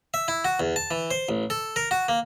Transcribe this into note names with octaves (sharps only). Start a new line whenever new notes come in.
E5
E4
F#4
E2
A5
E3
C5
A1
A4
A#4
F#4
A#3